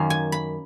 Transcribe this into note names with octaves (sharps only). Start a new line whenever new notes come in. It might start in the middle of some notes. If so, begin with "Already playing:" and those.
Already playing: F#2 D#3 A#3 C#4 F5
G#5
B5